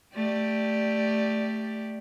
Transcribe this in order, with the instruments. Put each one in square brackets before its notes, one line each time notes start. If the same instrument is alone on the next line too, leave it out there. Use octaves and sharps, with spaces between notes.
[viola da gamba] A3 G4 D5